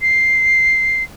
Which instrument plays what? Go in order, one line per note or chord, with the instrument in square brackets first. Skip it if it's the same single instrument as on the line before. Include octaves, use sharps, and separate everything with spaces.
[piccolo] C7